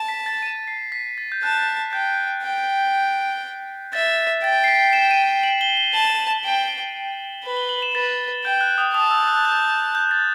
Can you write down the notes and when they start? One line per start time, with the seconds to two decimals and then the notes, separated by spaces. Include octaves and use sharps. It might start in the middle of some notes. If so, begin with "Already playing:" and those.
Already playing: A5
0.09 B6
0.26 A6
0.42 D#7
0.68 C7
0.92 B6
1.18 A6
1.32 G6
1.43 A5 F#6
1.93 G5 G6
2.43 G5
3.93 E5 A6
4.43 G5 A6
4.64 C7
4.68 B6
4.93 E7
5.11 D#7
5.43 F#7
5.61 G7
5.77 G7
5.93 A5 F#7
6.19 F#7
6.44 G5
7.44 B4
7.57 G7
7.69 F#7
7.82 E7
7.94 B4 A6
8.44 G5 G6
8.61 F#6
8.78 D#6
8.94 A5 D#6
9.11 E6
9.28 F#6
9.45 G6
9.95 G6
10.11 A6